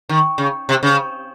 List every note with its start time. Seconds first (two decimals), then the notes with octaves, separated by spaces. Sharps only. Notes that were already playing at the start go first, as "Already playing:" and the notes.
0.09 D#3
0.38 C#3
0.69 C3
0.83 C#3